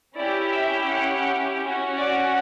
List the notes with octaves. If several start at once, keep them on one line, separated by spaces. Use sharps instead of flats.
C#4 E4 G4 D5
E5
F#5
C#4 F#4
D5